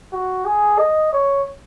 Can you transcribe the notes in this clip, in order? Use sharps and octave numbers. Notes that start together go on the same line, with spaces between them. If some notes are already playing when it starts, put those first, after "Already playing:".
F#4
G#4
D#5
C#5